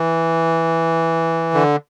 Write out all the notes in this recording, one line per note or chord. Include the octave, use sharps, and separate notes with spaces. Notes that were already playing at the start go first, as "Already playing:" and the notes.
Already playing: E3
D3